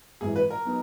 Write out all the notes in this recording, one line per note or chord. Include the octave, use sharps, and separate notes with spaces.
G#1 F#2 E3 G#4
B4
A#4
B2 F#3 B3 D#4